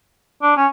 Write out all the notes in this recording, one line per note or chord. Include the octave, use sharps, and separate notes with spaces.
D4
C#4